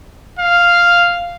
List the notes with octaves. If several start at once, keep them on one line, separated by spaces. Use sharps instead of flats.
F5